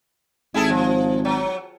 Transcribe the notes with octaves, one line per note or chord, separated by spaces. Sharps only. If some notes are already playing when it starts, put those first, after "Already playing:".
G#1 E4 G#4 A4
F3
F#3